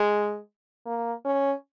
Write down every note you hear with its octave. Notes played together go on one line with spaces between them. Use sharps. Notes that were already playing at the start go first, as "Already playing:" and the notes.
Already playing: G#3
A#3
C#4